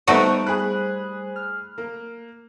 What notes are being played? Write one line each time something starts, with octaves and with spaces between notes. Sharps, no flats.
G3 A3 B3 D#4 F#4 B4 C5 D7
G#4 B5 F#6
F6
A#3